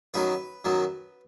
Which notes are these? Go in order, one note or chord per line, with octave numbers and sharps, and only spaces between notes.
F#2 D#3 F#3 B4
F#2 D#3 F#3